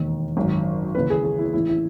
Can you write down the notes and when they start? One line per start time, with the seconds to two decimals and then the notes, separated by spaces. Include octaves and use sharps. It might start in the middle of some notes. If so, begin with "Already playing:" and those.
Already playing: E1 D#2 D#3
0.37 G#1 F#2 D#3
0.95 D#2 C#3 E3 B4
1.10 G#4
1.24 G#4
1.38 E4
1.53 A1 A2 E3 E4
1.69 E4